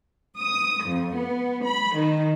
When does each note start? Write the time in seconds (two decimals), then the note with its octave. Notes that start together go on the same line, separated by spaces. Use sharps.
0.39 D#6
0.85 F2
1.17 B3
1.65 B5
1.97 D#3